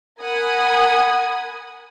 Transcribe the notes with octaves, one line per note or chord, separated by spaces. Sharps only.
A#4 F#5 G#5 B5 D#6 G#6